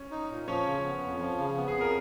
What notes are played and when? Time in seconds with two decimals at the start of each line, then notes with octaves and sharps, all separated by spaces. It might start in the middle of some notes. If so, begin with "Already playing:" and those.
Already playing: C#4
0.11 D#4
0.30 A#2
0.47 F3 C#4 C#5
0.66 C#3
0.85 B3
1.03 F2
1.20 F3
1.38 C#3
1.57 B3
1.68 G#4
1.75 F2
1.81 A#4